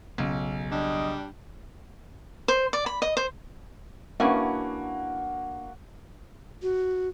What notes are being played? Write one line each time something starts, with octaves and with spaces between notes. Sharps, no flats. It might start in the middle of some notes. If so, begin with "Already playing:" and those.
B1 C#3
G3 D4 D#5
C5
D5
B5
D#5
C5
A#3 C#4 D4 E4 F#4 B4 F#5
F#4